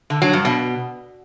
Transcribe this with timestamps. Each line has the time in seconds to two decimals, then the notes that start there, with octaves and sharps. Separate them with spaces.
0.10 D3
0.22 F#3
0.33 G2
0.45 B2